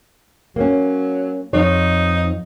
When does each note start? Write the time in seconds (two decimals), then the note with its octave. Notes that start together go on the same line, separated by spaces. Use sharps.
0.56 F#3 A#3 C#4
1.53 F2 D#4 C#5